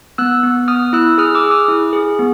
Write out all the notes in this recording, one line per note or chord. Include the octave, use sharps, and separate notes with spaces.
B3 E6 F#6
B3
B3 D#6 F6
E4 E6 F#6
G#4 D#6 F6
D6 E6
G#4
D#6 F6
E4
G#4
B3